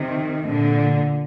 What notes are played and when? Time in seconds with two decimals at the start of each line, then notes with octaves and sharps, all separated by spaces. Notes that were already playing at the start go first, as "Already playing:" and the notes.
Already playing: C3 D#3
0.46 A#2 D3